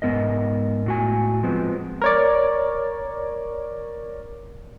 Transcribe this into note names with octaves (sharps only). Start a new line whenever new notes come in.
G#2 F3 B3 A#4 D#5
A2 F#4 G#5
F3 G#3 B3 C4
A#4 C#5 D5